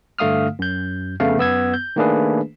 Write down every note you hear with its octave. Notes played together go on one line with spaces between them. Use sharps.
G2 D3 A3 F5 D#6 F6
F#2 G6
F2 C#3 A3 B3 F5
F#2 B3 E6 G#6
G6
D#3 A3 A#3 D4 G#4 B4